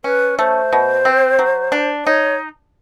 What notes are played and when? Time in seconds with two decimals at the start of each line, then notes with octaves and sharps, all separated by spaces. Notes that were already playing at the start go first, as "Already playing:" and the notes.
0.04 C#4 B4
0.39 A3 C5
0.73 B2
1.05 C4
1.39 F#3
1.72 D4
2.05 D#4 C#5